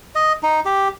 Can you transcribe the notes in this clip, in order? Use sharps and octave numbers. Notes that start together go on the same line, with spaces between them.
D#5
D#4
G4